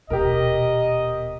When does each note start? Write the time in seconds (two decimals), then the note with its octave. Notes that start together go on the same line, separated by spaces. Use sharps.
0.10 D#1 B2 G4 A#4 D#5